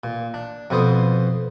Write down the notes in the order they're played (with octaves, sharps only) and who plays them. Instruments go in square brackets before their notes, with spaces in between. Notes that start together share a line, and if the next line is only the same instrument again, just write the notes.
[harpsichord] A#2
D4
F2 B2 B3 C5 D#6